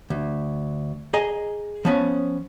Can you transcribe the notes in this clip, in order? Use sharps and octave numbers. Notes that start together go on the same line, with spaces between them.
D2
G#4 D#5 G#5 A#5
F3 B3 C#4